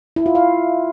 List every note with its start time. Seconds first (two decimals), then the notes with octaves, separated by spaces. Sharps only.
0.16 E4
0.26 F4
0.35 F5